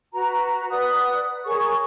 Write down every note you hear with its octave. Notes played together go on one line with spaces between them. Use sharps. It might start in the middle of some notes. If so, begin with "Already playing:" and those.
F#4 B4 A#5
B4 D5 F#5 D#6
G#4 A#4 C#5 C#6